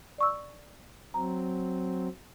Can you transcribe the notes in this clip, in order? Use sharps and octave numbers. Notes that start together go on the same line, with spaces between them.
D5 C#6 E6
F#3 C4 A#5